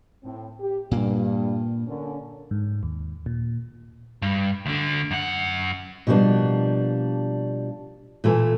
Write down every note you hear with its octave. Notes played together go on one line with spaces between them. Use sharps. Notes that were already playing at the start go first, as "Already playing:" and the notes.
A2 C4
G4
G2 A#2 A#3
D3 A#3 C#4
G#2
D#2
A#2
G2
D2 D3
F#2 F#5
B2 F3 G3 A#3 D4
A#2 E3 A3